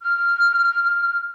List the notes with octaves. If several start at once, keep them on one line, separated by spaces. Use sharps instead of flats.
F6